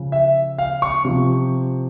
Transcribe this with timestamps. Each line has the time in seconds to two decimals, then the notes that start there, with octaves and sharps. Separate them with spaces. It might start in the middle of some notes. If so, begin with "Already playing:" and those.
Already playing: C#3 F3
0.12 E5
0.58 F5
0.82 C#6
1.05 C3 F3